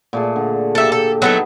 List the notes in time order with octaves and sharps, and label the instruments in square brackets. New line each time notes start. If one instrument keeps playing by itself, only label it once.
[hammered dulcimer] A#2 A3 G#4
D3
[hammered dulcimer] A#3 G4 [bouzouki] A4 E5
[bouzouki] A4
[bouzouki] F#3 A3 A4 [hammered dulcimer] B3 D#4